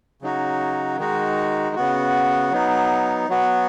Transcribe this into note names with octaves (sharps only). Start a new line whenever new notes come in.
C#3 F#3 D#4 F#4
D#3 G#3 D#4 F#4
C#3 B3 F#4
F#3 B3 D#4
F#3 B3 F#4